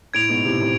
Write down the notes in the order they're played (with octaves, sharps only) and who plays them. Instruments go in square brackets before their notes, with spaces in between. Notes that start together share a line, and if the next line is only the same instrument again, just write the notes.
[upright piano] A2 [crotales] G#6 D7 F7
[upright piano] G#2 B2
A2 C3
A2 C3